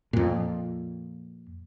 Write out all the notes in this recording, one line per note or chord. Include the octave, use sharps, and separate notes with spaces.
F2 A#2